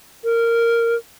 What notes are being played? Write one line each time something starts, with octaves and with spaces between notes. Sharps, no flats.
A#4